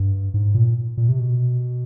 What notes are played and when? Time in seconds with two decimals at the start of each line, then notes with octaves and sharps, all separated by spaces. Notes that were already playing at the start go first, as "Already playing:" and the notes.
Already playing: G2
0.34 G#2
0.54 A#2
0.97 A#2
1.09 C3
1.19 B2